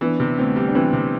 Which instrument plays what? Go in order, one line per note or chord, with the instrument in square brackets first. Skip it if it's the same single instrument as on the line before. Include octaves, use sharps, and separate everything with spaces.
[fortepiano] E3 [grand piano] B3 D4
[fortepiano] C3
[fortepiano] D2 [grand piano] C4
[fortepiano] G3
[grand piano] D4
[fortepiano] E3 [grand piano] C4
[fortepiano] C3